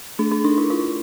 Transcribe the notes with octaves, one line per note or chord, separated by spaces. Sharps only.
A3 D4
D4
D4 D#4
E4
E4 F4